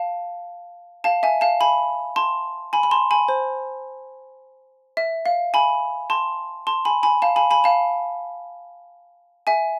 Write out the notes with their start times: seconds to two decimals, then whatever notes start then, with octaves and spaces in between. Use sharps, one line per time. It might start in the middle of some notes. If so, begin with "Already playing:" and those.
Already playing: F5 A5
1.04 F5 A5
1.23 E5 G#5
1.41 F5 A5
1.61 G#5 B5
2.16 A5 C6
2.73 G#5 B5
2.83 B5
2.91 A5 C6
3.11 G#5 B5
3.28 C5
4.97 E5
5.26 F5
5.54 G#5 B5
6.10 A5 C6
6.67 A5 C6
6.85 G#5 B5
7.03 G#5 B5
7.22 F5 A5
7.36 G#5 B5
7.51 G#5 B5
7.64 F5 A5
9.47 E5 G#5